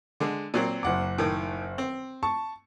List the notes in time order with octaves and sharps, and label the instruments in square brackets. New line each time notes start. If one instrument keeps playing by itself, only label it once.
[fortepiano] D3 G#3
A#2 F#3 C4
[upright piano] F#1 F#5 D6
[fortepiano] A2 D#3
C4
[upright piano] A5 C#6